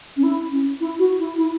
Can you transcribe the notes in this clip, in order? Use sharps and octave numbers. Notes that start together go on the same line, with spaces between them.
C#4
E4
C#4
E4
F#4
E4
E4